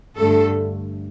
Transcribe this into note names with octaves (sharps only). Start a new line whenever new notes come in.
G2 D3 A3 A4